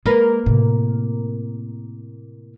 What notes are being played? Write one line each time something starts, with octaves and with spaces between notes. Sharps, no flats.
G#3 A#3 A#4 B4
A2 C3